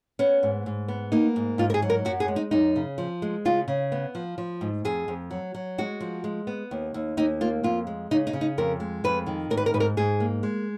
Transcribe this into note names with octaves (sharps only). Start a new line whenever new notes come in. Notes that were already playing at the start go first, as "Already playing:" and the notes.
B3 C#4
G#2
G#2
B3
A#3 D#4
G#2
G#2 F4
A#4
G#4
F#3
A#4
F#2 F#4
G#4
G#3
D#4
F#2 D#4
C#3
F3
G#3
C#3 F4
C#3
B3
F3
F3
G#2
F2 G#4
F2
F#3
F#3
G#3 F#4
F3
G#3
B3
D#2
D#2
D#2 D#4
A#3 F4
F2 F4
G#3
C#3 D#4
D#4
C#3
D#4
F2 A#4
G#3
F2 B4
D#3
G#2 A#4
B4
A#4
G#2 B4
A#4
G#2 G#4
A#3
G#3